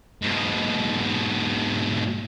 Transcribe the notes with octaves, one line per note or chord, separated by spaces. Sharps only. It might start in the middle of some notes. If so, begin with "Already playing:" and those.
G#2 B2